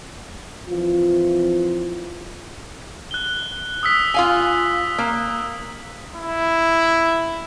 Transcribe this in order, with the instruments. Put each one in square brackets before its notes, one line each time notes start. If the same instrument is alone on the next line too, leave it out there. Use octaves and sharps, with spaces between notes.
[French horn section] E3 F3 C4 F4
[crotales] F#6 G7
D#6 E6 B6
[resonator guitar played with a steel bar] F4 F5 G#5
A#3
[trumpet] E4